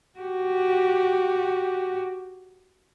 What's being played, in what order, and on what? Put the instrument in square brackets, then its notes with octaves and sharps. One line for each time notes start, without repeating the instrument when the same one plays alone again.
[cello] F#4 G4